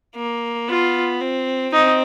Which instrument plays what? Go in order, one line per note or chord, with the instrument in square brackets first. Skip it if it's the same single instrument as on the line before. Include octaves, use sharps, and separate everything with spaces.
[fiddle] A#3
[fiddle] B3 [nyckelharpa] F4
[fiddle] C4
[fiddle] C4 [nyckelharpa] D#4